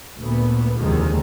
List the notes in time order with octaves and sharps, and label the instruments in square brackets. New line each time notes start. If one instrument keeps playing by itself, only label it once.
[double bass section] D2 A#2 A3 B3
F1 D#2 D3 D#3 F3 G#3